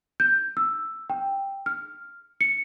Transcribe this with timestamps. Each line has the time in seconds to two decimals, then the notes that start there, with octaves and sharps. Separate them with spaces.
0.20 G6
0.57 E6
1.10 G5
1.66 F6
2.41 C#7